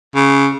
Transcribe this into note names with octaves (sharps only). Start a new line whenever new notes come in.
C#3